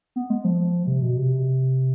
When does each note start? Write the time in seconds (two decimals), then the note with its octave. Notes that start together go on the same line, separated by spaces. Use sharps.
0.16 B3
0.30 G#3
0.44 F3
0.87 C3
1.02 B2
1.17 C3